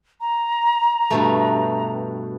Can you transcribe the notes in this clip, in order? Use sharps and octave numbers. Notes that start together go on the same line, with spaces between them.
A#5
G2 B2 A3